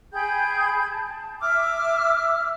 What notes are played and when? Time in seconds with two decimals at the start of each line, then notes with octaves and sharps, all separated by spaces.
0.12 G#4 G5 B5 G6
0.91 A5
1.41 E5 D6 E6 F6